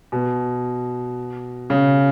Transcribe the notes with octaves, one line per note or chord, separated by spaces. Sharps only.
B2
C#3